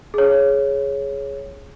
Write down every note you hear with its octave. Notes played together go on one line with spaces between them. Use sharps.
G#4 C#5